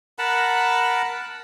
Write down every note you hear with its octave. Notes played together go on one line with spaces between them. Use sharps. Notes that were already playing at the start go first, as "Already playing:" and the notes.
A#4 F#5 A5 B5